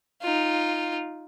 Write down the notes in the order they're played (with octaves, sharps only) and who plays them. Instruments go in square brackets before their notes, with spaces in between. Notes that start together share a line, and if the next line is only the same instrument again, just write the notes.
[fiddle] D#4 F4